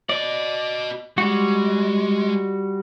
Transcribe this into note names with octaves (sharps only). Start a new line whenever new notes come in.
F#4 D5 D#5
G3 G#3 F#4